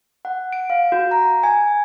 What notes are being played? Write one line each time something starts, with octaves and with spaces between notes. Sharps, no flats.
F#5
D7
F5
F#4
A#5
G#5